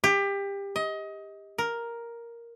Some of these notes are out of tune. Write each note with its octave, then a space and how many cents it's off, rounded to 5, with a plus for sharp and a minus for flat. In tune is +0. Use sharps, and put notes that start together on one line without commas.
G4 +25
D#5 +25
A#4 +5